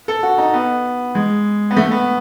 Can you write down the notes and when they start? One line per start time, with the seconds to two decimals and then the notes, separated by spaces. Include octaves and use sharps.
0.08 A4
0.23 F#4
0.38 D#4
0.54 B3
1.15 G#3
1.71 B3
1.77 A3
1.91 B3